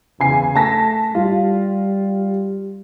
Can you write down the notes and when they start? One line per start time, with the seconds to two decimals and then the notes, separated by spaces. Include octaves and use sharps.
0.20 E2 C#3 G#5 C7
0.56 A3 A5 A#6 B6
1.15 G3 F4